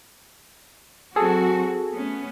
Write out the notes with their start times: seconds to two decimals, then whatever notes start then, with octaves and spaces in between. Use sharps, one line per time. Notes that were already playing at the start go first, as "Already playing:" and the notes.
1.16 F#3 C4 F#4 G#4 A4
1.94 A3 B3 C#4